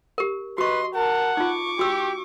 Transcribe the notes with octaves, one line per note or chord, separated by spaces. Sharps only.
G4 A#4
F#4 B4 D#5 C6 C#6
A#4 F#5 A5
D#4 F4 C#6 D6
F#4 G4 E6